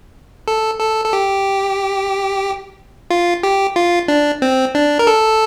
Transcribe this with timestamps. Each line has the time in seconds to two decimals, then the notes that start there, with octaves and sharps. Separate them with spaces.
0.48 A4
0.80 A4
1.05 A4
1.13 G4
3.11 F4
3.43 G4
3.76 F4
4.08 D4
4.42 C4
4.75 D4
4.99 A#4
5.07 A4